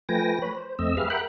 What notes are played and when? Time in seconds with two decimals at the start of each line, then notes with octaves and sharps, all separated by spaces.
0.09 F3 A3 B4 G5 G#5 A#6
0.42 B4 C#5 B5
0.55 C5
0.79 F2 A3 C4 D#5 E6
0.97 G4 G#4 B4 E5 F5 F6
1.10 A#4 E5 F#5 G5 B5 F#6